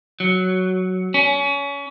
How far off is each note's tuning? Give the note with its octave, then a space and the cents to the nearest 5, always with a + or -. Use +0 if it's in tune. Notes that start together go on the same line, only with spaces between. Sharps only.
F#3 +0
C#4 +30